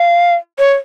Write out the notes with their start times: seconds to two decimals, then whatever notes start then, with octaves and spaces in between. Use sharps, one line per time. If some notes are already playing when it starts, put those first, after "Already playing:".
Already playing: F5
0.59 C#5